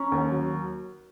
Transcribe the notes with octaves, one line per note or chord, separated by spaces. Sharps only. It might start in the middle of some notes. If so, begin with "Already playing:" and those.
Already playing: C#4 A#5 C#6
D#2
F#3